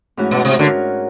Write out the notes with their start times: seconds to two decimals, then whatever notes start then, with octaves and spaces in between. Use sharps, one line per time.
0.17 G#2 E3 A3 C#4 F#4
0.31 B2
0.45 C3
0.59 D3 G#3 C#4 F#4 A#4